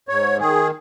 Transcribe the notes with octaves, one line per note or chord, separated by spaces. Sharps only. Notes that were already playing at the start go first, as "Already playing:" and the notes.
G#2 C#5
D#3 G#4